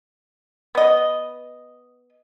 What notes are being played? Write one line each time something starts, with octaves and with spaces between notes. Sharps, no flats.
B3 D#5